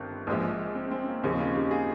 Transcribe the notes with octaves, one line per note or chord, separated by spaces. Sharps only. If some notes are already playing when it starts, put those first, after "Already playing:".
Already playing: G1 G2 D#3 C4
A#1 G#2 F3 G#3
C4
C4
A#3 C#4
D#2 C#3 F3 C4 D#4
C#4 F4
D#4 G4
F4 G#4